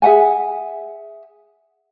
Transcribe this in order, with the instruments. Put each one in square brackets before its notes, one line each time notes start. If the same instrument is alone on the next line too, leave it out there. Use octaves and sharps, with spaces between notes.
[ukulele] G#4 E5 F#5 G#5